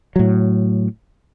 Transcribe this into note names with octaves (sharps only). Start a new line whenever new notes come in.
A2 F#3